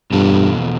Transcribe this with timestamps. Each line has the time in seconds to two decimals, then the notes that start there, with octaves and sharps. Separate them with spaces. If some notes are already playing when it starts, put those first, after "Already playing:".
0.12 E2 G2 B2 B3 F4 A4